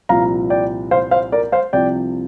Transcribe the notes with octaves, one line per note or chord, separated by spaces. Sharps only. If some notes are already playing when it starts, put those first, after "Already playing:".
C2 A#2 F3 F5 A#5
D5 G5
C5 F5
C5 F5
A#4 D5
C5 F5
C2 C3 F3 D5 G5